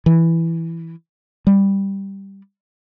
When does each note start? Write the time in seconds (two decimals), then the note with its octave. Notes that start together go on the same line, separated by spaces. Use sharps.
0.06 E3
1.47 G3